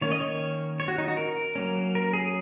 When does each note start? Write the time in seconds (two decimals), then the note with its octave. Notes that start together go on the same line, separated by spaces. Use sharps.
0.01 D#3 A#3 C#4 C#5
0.12 D#5
0.20 C#5
0.80 C#5
0.88 F#4
0.98 D#4
1.08 F#4
1.17 A#4
1.56 F#3 A#3 C#4
1.95 A#4
2.13 G#4